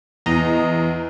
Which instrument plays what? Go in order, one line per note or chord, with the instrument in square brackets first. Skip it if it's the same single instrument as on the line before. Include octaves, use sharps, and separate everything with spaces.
[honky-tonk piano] E2 [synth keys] D#5 A#5